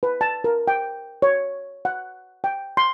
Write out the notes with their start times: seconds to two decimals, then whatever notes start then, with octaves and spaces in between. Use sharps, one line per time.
0.03 B4
0.21 A5
0.44 A#4
0.68 G5
1.22 C#5
1.85 F#5
2.44 G5
2.77 C6